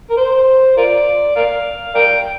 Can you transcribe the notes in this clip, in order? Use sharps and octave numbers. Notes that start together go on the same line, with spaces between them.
A#4
C5
F4 A#4 D5
A#4 D5 F5
A#4 D5 G5